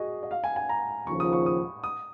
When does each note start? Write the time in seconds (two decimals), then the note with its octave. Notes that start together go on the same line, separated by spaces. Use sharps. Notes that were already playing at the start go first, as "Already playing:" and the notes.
Already playing: F#4 G#4 D#5
0.23 D#5
0.31 F5
0.44 G#5
0.56 G#5
0.69 A#5
1.07 D#2 C#3 F3 C#6
1.20 D#6
1.33 C#6
1.46 D#6
1.84 D#6